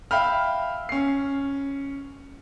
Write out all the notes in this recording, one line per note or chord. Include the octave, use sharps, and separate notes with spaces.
E5 F5 G5 B5 F6
C#4 C7